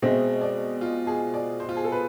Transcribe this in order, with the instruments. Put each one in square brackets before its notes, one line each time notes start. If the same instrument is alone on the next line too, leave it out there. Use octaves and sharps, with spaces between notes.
[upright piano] B2 G#3 C4 [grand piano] E5
[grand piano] D5
F4
G#4
D5
C5
F4
G#4
A4
B4